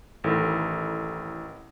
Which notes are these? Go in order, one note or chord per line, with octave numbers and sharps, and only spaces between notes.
A1 D#3 E4 A4